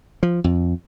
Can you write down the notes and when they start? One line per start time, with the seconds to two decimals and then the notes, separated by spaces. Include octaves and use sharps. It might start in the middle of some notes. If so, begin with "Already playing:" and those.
0.23 F3
0.44 F2